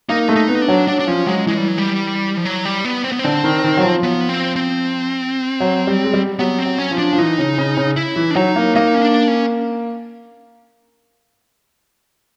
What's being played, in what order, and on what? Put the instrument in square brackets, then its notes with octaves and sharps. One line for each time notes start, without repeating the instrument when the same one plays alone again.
[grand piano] A#3 [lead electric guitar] D#4
[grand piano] A3
[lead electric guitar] D#4
[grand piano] B3
[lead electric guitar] D4
[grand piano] F#3
[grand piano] F#3 [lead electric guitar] D4
[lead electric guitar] D4
[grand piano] F3 [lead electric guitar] C#4
[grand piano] F#3 [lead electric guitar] G#3
[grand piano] E3 [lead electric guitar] G#3
[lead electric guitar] G3
F#3
G3
F3
F#3
G3
B3
C4
B3
C4
[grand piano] D3
D#3
D#3
F#3
F3
[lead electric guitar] B3
C4
C4
[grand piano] F#3
G3
G#3
G3
[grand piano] F#3 [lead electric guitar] B3
[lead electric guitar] C4
[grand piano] F#3
[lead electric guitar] C#4
[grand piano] F3
[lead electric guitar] D4
[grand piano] F3
[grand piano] E3 [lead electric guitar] D#4
[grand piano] C#3
C#3
C#3
[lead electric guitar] E4
[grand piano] E3
[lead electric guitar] D4
[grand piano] F#3 [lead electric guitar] D#4
[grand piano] A#3
[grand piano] A#3 [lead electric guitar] D#4
[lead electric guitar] C#4
D4
C#4